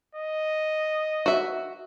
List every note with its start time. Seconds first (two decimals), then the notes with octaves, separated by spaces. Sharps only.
0.15 D#5
1.26 F#4 E5